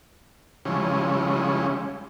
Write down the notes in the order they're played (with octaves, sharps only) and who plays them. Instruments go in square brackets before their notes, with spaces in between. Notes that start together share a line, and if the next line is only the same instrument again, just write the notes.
[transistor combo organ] C#3 E3 F3 G3 G#3 C#4